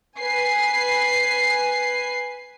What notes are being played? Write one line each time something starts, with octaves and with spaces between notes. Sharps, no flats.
B4 G#5 C7